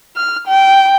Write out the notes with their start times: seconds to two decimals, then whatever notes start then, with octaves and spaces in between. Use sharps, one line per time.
0.17 F6
0.47 G5